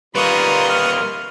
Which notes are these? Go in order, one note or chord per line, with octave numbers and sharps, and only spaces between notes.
G3 A#3 D#4 F4 B4 C6 C#6 D#6
F6